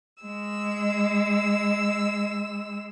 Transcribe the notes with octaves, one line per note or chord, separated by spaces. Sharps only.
G#3 E6